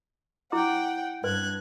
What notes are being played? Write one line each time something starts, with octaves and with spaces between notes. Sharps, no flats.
E4 F#5 G5 D6
G2 B4 F#6 G#6